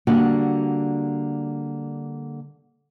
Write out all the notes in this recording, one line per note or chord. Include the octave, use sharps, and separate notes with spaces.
D3 G3 A#3 F#4